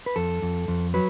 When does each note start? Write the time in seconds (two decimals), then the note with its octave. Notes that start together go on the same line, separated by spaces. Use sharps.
0.06 B4
0.16 F2 A4
0.42 F2
0.68 F2
0.94 F#3 B4